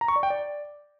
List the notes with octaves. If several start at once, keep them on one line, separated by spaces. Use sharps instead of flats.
A#5
C#6
D5
G5
D5